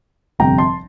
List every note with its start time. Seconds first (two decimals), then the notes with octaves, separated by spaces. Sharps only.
0.39 G1 F2 C3 G3 C4 G5 A#5
0.58 A5 C6